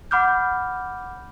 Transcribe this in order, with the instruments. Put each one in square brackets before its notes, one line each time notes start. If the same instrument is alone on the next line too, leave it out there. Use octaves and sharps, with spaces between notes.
[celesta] F#5 B5 D6 F6 G6